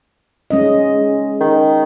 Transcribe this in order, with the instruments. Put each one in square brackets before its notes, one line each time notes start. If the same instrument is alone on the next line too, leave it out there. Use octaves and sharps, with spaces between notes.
[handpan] G#3 C#4 D#5
[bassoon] D#3